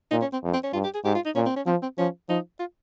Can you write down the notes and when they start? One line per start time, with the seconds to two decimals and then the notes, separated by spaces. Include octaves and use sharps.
0.11 A#2 D#4
0.22 C#4
0.33 C4
0.43 F2
0.54 C4
0.64 C#4
0.73 G2 F4
0.84 G4
0.94 G#4
1.05 G#2 G4
1.15 F4
1.25 D#4
1.35 A#2 C#4
1.46 C4
1.56 C#4
1.66 F3 C4
1.82 C4
1.98 F3 C#4
2.29 F3 D#4
2.60 F4